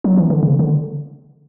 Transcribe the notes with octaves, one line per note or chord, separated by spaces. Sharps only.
F#3
E3
D3
C#3
D3